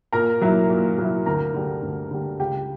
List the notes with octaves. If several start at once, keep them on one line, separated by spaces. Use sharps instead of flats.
A#2 A#4 A#5
F#3 A#3 E4
A#2
F#3 A#3 E4
D2 A#4 A#5
D3 G3
D2
D3 G3
C#2 G4 G5